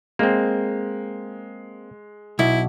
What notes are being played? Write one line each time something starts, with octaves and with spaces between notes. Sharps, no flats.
G#3 A#3 C4
B1 E4